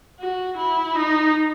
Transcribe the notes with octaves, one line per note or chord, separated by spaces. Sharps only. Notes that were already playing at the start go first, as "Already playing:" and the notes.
F#4
E4
D#4